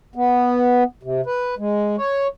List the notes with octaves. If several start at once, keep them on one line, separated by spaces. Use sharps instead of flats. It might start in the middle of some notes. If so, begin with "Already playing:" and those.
B3
C3
B4
G#3
C#5